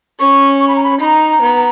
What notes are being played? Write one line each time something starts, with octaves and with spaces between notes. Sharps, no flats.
C#4 C#6
C#6
B5
A#5
B5
D#4 A#5 B5
B3